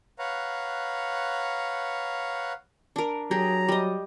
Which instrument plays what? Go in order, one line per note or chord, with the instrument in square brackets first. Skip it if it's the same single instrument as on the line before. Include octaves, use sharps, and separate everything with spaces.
[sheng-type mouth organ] B4 C#5 F5 F#5 A#5
[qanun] D4 A#4
[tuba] F#3 [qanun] G4 G#4 [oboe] A#5
[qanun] G3 D#5